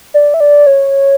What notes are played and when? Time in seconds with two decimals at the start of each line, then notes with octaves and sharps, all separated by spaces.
0.14 D5
0.34 E5
0.40 D5
0.66 C#5